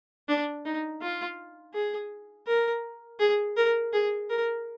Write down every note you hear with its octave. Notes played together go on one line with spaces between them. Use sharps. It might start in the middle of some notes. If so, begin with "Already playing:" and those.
D4
D#4
F4
G#4
A#4
G#4
A#4
G#4
A#4